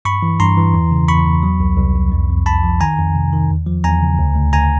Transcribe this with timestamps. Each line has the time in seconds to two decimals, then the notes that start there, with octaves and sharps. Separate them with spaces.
0.05 G2 B5 C#6
0.23 E3
0.40 G2 A#5 C6
0.57 E3
0.74 E2
0.92 C#3
1.08 E2 B5 C#6
1.26 E2
1.43 F#3
1.60 C2
1.78 C2
1.95 C2
2.12 F2
2.30 F2
2.46 F2 A5 B5
2.63 F3
2.81 D#3 G#5 A#5
2.98 F2
3.15 C3
3.33 D#3
3.50 E2
3.67 F3
3.84 E2 G#5 A#5
4.02 C#3
4.19 D2
4.36 D2
4.53 D2 G#5 A#5